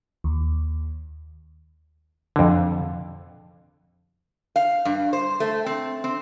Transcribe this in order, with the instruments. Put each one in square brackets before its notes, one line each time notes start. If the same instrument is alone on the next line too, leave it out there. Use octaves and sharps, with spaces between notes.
[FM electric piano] D#2
[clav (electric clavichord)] F2 D3
[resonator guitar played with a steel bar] F5
G2
C5
A3
C4
C4